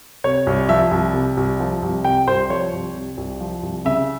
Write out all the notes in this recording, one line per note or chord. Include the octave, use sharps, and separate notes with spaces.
C3 C#5
C2
F3 E5
C2
C3
C2
F3
C2
C3 G5
C2 C5
F3 C#5
C2
C3
C2
F3
C2
C#3 E5